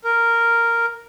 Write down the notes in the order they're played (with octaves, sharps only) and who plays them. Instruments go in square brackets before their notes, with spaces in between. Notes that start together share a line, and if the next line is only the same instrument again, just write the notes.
[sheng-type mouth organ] A#4